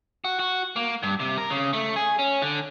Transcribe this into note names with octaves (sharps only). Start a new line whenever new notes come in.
F#4
F#4
A#3
G2
C3
A#4
C#3
A3
G#4
C#4
D3